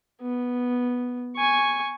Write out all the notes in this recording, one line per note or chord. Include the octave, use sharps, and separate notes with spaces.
B3
G#5 C#6